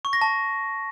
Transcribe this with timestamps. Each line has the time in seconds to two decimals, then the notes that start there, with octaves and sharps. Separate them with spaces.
0.05 C#6
0.13 A#6
0.21 A5